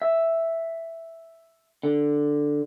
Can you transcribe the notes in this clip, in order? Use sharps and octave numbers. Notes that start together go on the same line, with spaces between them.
E5
D3